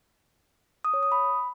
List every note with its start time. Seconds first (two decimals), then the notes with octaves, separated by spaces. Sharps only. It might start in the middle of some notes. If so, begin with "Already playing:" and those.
0.85 D#6
0.94 C#5
1.03 D#6
1.12 B5